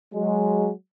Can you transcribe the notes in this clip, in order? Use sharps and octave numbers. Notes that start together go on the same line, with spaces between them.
F#3 G#3